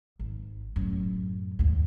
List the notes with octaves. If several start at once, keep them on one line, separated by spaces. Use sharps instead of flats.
G#1
F#2 A2
D#2 G#2